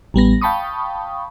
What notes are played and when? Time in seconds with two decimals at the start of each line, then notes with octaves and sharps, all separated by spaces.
0.14 A1 G3 B3 A#6
0.41 F5 G5 A5 B5 C#6 D#6